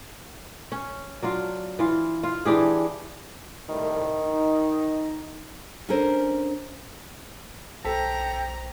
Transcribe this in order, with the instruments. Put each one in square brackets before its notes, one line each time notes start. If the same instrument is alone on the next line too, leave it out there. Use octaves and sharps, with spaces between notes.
[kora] C#4
F#3 D4 F4
E3 F4
F4
E3 D4 G4 G#4
[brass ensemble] C2 A2 [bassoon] D#3
[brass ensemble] D#4
[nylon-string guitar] C#4 D4 A4 A#4 C5 G#5
[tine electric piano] B1 C5 B6 [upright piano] A4 [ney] G5 [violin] A#5